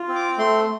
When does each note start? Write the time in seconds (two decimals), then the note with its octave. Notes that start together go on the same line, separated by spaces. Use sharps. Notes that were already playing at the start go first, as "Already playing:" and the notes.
Already playing: F4
0.08 C4
0.15 D6
0.38 A3 C6